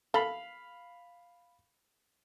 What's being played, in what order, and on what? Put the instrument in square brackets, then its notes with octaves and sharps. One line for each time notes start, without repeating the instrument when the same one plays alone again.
[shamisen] A4 [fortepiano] F5 B5